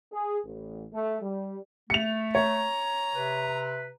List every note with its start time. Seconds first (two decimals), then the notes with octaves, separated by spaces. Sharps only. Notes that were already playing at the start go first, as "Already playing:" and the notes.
0.12 G#4
0.45 A1
0.94 A3
1.22 G3
1.90 A3 C#7 F7
2.35 C#5 A#5
3.15 C3 B4